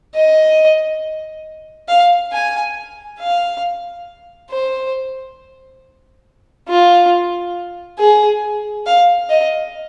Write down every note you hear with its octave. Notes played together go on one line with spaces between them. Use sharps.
D#5
F5
G#5
F5
C5
F4
G#4
F5
D#5